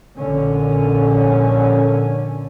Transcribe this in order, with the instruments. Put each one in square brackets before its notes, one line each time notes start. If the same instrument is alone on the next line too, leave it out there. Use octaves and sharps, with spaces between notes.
[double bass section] A#1 D3 C#4